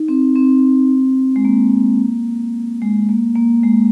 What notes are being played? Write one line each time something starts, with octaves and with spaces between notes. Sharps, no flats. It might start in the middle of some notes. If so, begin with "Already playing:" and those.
Already playing: D#4
C4
C4
G#3
A#3
G#3
A#3
A#3
G#3